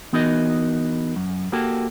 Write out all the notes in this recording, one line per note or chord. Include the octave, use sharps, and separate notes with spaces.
E3 B3 D#4 F#4 A#4 D#5
F#2
A#3 F#4 G4 A4